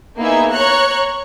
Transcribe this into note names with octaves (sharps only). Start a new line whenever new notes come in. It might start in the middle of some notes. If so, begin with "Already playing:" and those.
A#3 B3 D#4 E4 G#4 E5
C#5 A#5 C#6 F#6